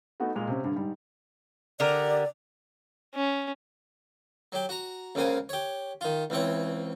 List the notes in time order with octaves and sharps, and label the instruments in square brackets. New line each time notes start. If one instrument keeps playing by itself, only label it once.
[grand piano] A3 B3 D#4 F#4
A#2 G#3 F7
C3 C4 C#4
G2 D3
G#2 G3
[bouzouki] D3 G4 A#4 [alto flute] D5
[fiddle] C#4
[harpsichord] F#3 G4
F#4 A#5
C#2 C#3 A#3 C5 G#5
G4 C#5
D#3 F4
C#2 E3 C4 C#5